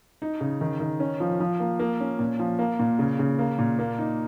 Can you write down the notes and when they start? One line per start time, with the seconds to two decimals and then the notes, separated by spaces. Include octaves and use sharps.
0.22 D#4
0.41 C#3
0.61 D#3
0.80 D#3
1.00 C#4
1.20 F3
1.40 F3
1.60 A#3
1.80 A#3
2.00 C#4
2.19 A#2
2.39 F3
2.59 A#3
2.79 A#2
2.99 C#3
3.19 C#3
3.39 A#3
3.59 A#2
3.79 A#3
3.98 D#4